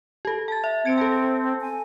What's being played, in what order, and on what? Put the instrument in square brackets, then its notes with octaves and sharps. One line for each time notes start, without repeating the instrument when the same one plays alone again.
[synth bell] G4 A4
A5 A6
E5
[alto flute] C4 [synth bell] G#6 C#7 D7
[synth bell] A4 A5
[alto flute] G#5